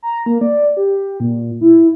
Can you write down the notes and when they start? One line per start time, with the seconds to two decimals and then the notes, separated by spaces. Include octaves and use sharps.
0.03 A#5
0.26 A#3
0.41 D5
0.77 G4
1.20 A#2
1.61 E4